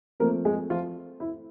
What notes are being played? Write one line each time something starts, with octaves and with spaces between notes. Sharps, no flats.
F3 A3 A#3 C4 A#4
G#3 G#4
F3 F4
E4